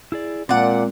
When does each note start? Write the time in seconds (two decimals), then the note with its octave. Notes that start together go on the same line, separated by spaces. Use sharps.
0.12 E4 G#4 D5
0.49 A#2 G#3 C4 D5 F#5